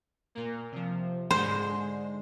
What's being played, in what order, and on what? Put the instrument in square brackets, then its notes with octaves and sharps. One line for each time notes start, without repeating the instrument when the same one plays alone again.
[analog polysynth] A#2 A#3
C3 F3
[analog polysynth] G#2 D3 G#3 [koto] C5